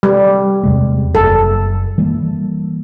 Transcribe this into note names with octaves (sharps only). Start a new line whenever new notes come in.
G3
E2 C3 G#3
F#1 A4
E3 G3 A#3